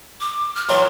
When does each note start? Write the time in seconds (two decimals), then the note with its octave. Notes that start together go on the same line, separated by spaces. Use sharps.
0.20 D6
0.55 F6
0.69 A#2 E3 F#3 C6